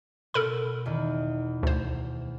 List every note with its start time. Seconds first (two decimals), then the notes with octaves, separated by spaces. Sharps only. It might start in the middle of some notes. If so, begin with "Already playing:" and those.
0.34 B2 A4 A#4 B5
0.86 E2 D#3
1.63 D2 C5